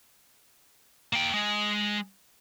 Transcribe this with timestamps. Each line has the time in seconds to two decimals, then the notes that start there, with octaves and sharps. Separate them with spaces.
1.13 A#3 G5
1.34 G#3